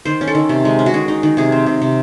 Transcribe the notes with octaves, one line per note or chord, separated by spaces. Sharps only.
D#3 C5
C#4
A4
D#3
C3
G#3
C#4
F#4
D#3 G#4
D#4
D#3
C3 G#4
C4
C3
C3